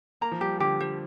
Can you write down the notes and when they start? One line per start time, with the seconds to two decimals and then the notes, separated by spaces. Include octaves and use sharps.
0.21 A#3 A#5
0.31 F3
0.41 G3 G4
0.60 D3 G4
0.80 G3 C5